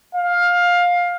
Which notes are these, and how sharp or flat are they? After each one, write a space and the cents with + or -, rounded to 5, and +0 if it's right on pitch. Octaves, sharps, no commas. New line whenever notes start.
F5 +15